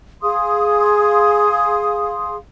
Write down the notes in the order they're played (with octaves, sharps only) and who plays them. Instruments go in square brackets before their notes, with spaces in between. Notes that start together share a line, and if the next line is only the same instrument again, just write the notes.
[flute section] G#4 F5 C6 D#6